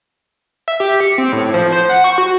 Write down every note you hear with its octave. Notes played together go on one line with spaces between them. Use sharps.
E5
G4
C#7
C4
A2
F3
C5
F#5
C#6
F#4